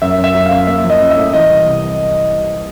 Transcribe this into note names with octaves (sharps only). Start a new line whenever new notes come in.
F#2 E5
F#2
E5
F#2
F#2 F5
A#3 E5
F3
D#5
C#4
E5
A2
E3 D#5
C2
C3